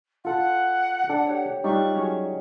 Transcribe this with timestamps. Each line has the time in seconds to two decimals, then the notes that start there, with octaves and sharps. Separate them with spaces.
0.25 F4 A4 F#5
1.09 D4 A4
1.26 G4 C#5
1.64 G3 D#4 F4 G4 C#6 F#6
1.94 F#3 C#4 G#4